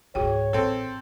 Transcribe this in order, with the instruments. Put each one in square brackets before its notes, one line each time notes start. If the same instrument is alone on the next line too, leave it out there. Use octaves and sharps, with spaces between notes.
[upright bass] C#2 G#2 [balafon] F#4 G#4 G5 [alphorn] C#5
[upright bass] A1 [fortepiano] C4 A4